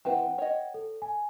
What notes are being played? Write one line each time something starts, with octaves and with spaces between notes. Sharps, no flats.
E3 C4 B4 F#5 G5
C#5 D#5
A4
G#5